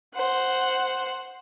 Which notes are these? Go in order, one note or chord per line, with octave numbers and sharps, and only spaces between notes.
C5 F#5